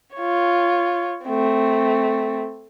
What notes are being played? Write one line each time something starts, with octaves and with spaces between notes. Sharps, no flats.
F4 C#5
A3 C4